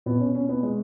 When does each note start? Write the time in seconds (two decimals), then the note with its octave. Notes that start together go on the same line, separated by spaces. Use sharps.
0.06 B2 B3
0.20 C#4
0.35 C#4
0.49 B3
0.63 G#3